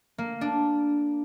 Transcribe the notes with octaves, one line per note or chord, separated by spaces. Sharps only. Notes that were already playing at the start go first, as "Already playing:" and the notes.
A#3
D4